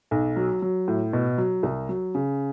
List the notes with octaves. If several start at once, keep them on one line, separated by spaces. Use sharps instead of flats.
B1
F#3
F#3
A2
B2
F#3
C2
F#3
C#3